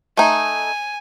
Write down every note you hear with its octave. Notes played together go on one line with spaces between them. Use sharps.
A3 D#4 G#5